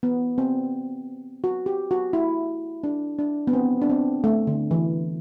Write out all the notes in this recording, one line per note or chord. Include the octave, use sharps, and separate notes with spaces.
B3
C4
F#4
G4
F#4
E4
D4
D4
B3
C4
D4
C4
A3
D3
E3